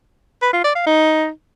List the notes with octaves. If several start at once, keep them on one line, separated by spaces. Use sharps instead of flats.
B4
F4
D5
F5
D#4